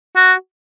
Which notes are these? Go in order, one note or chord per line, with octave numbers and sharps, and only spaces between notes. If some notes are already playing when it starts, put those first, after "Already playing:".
F#4